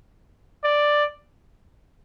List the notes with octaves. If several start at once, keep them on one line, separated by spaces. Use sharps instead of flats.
D5